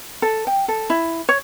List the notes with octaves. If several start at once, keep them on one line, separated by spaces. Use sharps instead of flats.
A4
G5
A4
E4
C#5